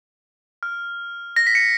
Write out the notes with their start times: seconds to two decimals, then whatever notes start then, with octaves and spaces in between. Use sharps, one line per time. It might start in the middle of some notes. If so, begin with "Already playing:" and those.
0.63 F6
1.36 A#6
1.47 B6
1.55 C#7